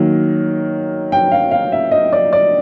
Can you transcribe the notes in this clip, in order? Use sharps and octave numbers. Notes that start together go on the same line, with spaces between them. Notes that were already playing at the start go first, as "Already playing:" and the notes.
Already playing: D#3 F#3 A#3
G5
F5
F5
E5
D#5
D5
D5